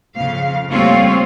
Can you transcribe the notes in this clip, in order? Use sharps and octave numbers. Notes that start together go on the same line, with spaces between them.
F2 C#3 F5
D#2 G3 A3 C4 F4 C#5